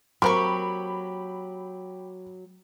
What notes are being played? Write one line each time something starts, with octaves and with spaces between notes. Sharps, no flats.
F#3 A#3 C4 G4 A#4 B5 C#6